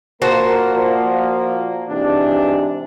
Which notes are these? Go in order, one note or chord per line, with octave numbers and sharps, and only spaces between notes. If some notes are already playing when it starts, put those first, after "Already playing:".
A#2 A#3 F#4 A#4 C5 A5
A#2 F3
G#2 C3 E3 D4